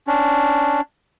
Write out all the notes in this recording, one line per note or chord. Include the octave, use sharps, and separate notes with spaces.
C#4 D4